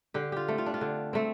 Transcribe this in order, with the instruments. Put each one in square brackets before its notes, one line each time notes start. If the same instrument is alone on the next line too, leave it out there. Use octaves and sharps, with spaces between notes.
[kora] D3 G4
F4 G4
A3 C4
F4
D4
F4
D3
A3 C4